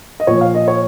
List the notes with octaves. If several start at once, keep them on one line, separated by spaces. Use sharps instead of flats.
D#5
A#2 F3 C#5
F5
D#5
C#5